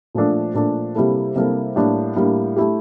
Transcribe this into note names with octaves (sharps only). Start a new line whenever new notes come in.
A#2 F3 A3 D4 A4
A#2 F3 A3 D4 A4
C3 G3 A#3 E4 A4
C3 G3 A#3 E4 A4
A2 G3 A#3 D4
A2 G3 A#3 D4
A3 E4 G4